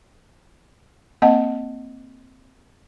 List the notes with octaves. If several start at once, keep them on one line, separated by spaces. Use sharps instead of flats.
A#3 C4 D#5 F#5 A5